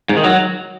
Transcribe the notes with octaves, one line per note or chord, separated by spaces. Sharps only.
G#2
D#3
F#3